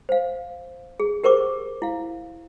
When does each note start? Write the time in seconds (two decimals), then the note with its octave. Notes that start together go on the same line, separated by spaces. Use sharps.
0.09 C5 F5
1.00 G#4
1.24 G4 A#4 C5 C#6 D6
1.82 E4 F5